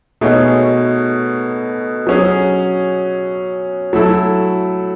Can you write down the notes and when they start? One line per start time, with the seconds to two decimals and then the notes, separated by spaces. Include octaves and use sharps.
0.21 B2 A3 D#4 G#4 C#5
2.07 F#3 C#4 G#4
3.93 F#3 A3 E4 A4